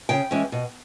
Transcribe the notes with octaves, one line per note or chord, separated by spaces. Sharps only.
C#3 G5
E3 G#3 C#4
B2